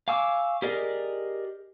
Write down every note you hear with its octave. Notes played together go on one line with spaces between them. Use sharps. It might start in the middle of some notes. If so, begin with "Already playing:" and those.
F5 G#5 C#6 D6 E6
G4 G#4 A#4 D5 D#5